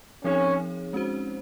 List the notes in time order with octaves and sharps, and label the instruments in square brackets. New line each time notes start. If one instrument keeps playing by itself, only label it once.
[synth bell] F3 C4 D#4 G#4 C#5 [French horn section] C#4
[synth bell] G#3 C#4 F#4 C5